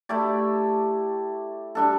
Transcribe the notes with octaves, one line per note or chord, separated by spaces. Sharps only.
A3 E4 G4 D5
G3 D4 A4